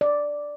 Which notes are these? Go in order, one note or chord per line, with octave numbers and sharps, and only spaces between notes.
D5